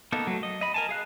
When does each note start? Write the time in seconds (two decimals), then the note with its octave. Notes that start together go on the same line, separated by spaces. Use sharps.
0.12 A#3 B3 D#4 A4
0.27 F#3 A3
0.43 D#5
0.61 D#5 B5
0.74 A#4 G#5 A5
0.89 G#4 F5 F#6